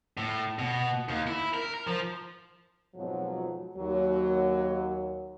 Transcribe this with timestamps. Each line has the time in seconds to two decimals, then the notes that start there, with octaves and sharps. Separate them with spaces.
0.17 A2
0.59 B2
1.09 D#2
1.27 E4
1.54 A#4
1.74 A#4
1.87 F3
2.95 F2 G#2 B2 F3 F#3
3.76 D#2 F#3